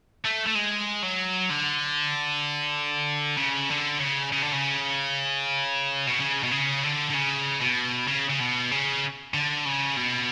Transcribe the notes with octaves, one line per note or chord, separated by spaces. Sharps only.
A3
A3
G#3
F#3
D3
C#3
D3
C#3
C#3
D3
C#3
B2
C#3
B2
C#3
D3
D3
C#3
B2
C#3
C#3
B2
C#3
D3
C#3
B2